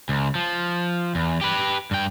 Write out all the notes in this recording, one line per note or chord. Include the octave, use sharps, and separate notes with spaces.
C#2
F3
E2
G4 B4
G2 G5